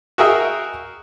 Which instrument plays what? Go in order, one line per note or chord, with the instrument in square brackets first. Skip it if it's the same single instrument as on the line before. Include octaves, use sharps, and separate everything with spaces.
[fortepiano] F#4 G#4 A#4 D#5 E5 G5